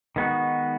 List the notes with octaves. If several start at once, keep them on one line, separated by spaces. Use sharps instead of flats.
D#3 G#3 B3 D#4 F#4